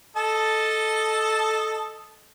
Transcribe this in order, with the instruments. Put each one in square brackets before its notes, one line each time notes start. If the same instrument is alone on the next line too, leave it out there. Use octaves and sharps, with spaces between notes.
[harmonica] A4 D#5 A5